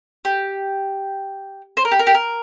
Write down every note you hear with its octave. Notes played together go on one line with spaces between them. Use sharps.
G4
C5
A#4
G4
A#4
G4
A#4